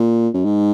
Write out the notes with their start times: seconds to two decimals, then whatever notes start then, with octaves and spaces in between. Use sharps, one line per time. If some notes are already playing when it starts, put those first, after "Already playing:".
Already playing: A#2
0.34 F#2
0.45 G#2